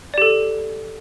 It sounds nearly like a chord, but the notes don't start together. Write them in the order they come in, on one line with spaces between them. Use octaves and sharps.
D5 G4 A4